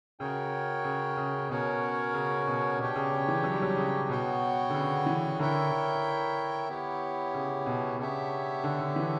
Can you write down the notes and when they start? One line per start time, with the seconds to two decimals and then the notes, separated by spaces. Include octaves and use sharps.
0.19 C#3 F#4 A#4 C#5 G5
0.84 C#3
1.17 C#3
1.49 B2 C#4 F#4 A#4 C#5
2.14 C#3
2.47 B2
2.79 B2 D4 G4 C#5 G5
2.96 C#3
3.12 C#3
3.28 E3
3.44 F#3
3.54 G3
3.62 F#3
3.77 C#3
4.09 B2 B3 F#4 C#5 G5
4.70 D3
4.74 C#3
5.06 E3
5.39 D3 E4 A#4 C#5 E5 G5
5.71 D3
6.68 B3 E4 G4 C#5
7.34 C#3
7.66 B2
7.99 C#3 B3 D4 G4 C#5 E5
8.64 D3
8.80 D3
8.96 E3